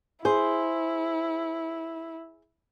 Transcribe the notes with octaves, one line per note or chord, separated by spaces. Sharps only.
E4 G#4 C5